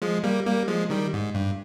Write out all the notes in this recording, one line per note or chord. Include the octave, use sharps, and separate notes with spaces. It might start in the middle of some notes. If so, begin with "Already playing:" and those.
F3 G#3
G3 A#3
G3 A#3
F3 G#3
D#3 G3
G#2
G2